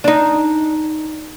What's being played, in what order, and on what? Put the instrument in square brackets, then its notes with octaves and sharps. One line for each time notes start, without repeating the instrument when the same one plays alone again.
[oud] D4 D#4